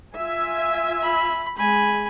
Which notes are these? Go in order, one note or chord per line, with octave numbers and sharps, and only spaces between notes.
F4 E5 G#5
B5
G#3 G#5 B5